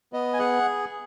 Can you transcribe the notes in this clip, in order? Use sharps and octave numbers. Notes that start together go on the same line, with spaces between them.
B3 D#5
G#5
G#4 F#5